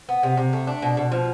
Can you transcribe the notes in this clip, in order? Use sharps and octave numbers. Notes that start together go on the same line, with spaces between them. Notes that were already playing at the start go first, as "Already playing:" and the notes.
B3
C3
C3
A3
D4
B2
B2
F3